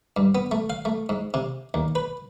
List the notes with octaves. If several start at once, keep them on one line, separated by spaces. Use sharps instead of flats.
G2
B3
A3
F5
A3
G#2
C3
D#2
B4